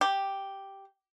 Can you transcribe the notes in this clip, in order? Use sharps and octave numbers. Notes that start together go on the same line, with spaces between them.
G4